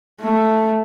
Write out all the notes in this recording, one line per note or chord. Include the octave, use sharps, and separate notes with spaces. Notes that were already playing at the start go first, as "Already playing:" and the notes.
A3